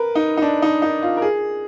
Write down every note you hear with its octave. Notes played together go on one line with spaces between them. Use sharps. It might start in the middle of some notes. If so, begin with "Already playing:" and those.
Already playing: A#4 B4
D#4
D#4
D4
D#4
D#4
F4
A#4
G#4